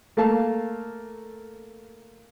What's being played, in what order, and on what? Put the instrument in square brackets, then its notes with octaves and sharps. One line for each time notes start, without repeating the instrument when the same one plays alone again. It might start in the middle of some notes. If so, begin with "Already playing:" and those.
[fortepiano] A3 A#3 F5 A5